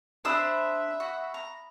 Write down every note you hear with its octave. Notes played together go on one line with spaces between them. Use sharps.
D4 C5 E5 B5 D#6 E6
F#4
A#5